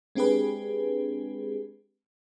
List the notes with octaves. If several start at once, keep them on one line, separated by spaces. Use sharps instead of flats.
G#3 C4 D4 G4 G#4 B4